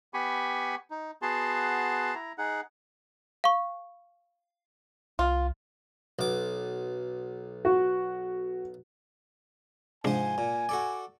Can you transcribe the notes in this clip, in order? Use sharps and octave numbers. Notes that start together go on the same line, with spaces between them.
B3 G4 G#5 B5 C#6
D#4
B3 F#4 G#4 A5 C6
E4 A#5
D#4 G#4 F#5
F5 C#6
C2 F4
B1 D6
F#4
G#2 C3 F3 G#3 D4 C5 G#5
A#2
F#4 A4 D5